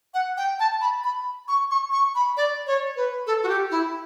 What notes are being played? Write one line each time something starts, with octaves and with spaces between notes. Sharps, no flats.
F#5
G5
A5
B5
B5
C#6
C#6
C#6
B5
D5
C#5
B4
A4
F#4
G4
E4